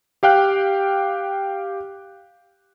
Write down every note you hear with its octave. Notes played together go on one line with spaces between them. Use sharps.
G4 F5 G5 F#6